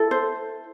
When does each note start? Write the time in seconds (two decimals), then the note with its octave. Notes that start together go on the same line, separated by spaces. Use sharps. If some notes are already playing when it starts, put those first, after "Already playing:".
Already playing: E4 A4
0.11 C5